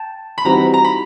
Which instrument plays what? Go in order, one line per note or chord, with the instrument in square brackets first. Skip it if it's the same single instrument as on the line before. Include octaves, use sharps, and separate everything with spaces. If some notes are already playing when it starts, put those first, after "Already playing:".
Already playing: [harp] G5 A5
B5
[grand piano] E3 G3 C4 D#4 F#4 [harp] A#5
[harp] A#5
B5